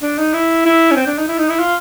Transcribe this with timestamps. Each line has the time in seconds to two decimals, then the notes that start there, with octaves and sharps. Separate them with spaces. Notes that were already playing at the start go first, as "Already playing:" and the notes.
0.02 D4
0.18 D#4
0.34 E4
0.65 E4
0.91 C#4
0.96 C4
1.06 D4
1.18 D#4
1.28 E4
1.38 D#4
1.49 E4
1.59 F4